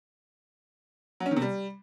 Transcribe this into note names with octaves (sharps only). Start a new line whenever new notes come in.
F#3
C#4
D#3
C3
G3